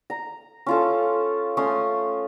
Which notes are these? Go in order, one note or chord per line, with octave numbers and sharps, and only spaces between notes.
A#5
C#4 F4 A4
A3 C#4 C6 D#6